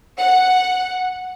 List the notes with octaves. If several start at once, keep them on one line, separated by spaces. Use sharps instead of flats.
F#5